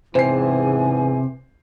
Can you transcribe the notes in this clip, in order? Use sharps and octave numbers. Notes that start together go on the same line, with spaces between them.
E2 G#2 C3 E3 C5 G#5 C7